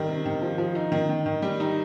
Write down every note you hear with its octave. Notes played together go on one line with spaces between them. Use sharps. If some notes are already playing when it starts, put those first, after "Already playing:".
Already playing: D#3 G3
C3
D#3
F3
F3
D#4
D#3
D#3
D#3
G3
D#4